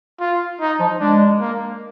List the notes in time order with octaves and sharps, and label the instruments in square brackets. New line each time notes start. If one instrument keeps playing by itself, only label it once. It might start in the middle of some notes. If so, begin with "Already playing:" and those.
[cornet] F4
D#4
[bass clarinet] F3
[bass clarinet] G#3 [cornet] D4
[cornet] A#3